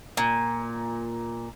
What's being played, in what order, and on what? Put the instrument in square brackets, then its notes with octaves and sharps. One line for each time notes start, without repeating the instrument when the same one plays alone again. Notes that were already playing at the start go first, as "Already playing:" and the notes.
[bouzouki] A#2